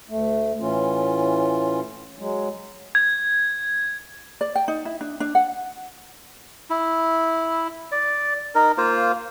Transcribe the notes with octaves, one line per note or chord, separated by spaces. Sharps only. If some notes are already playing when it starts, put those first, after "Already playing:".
D2 A3
A2 E3 C#4 F4
F#3 G#3
G#6
D5
G5
D#4
E4
D4
D4
F#5
E4
D5
D#4 A#4
A#3 F4 C5